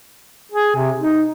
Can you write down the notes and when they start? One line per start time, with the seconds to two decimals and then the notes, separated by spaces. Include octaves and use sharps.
0.52 G#4
0.76 C3
1.00 D#4